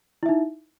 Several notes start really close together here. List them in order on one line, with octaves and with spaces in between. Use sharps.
E4 E5 D#4